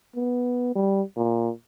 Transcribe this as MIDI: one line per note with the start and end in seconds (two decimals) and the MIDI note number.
0.16 0.71 59
0.75 1.02 55
1.17 1.50 46